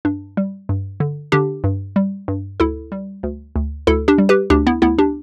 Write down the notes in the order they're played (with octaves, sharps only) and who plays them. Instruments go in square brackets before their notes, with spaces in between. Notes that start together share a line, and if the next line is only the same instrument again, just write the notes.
[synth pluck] G2 D4
G3
G2
D3
D3 D4 G4
G2
G3
G2
D2 E4 A4
G3
D2
D2
D2 E4 A4
D4 G4
G3
G4 B4
D2 D4 G4
B3 E4
D2 B3 E4
D4 G4